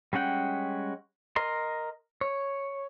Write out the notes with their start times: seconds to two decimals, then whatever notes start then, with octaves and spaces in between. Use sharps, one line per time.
0.13 G3 G#3 C#4 F#5 G5
1.36 A#4 D#5 C6
2.21 C#5